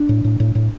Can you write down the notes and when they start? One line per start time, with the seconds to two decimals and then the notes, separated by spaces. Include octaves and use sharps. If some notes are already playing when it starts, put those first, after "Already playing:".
Already playing: D4
0.09 A2
0.24 A2
0.40 A2
0.55 A2